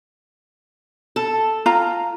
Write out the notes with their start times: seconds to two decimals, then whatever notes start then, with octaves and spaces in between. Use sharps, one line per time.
1.16 A4
1.66 F4 A#5